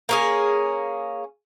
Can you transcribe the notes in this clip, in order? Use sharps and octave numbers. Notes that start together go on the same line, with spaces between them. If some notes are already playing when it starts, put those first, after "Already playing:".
A#3 C#4 G#4